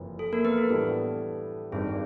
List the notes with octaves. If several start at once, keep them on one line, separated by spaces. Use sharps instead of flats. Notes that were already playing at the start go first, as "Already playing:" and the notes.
Already playing: F#1 F2 C3 E3
A4
A#3 A#4
B3 B4
A4
A2 E3 G3 B3 D4 A4
G#1 G2 D#3 G#4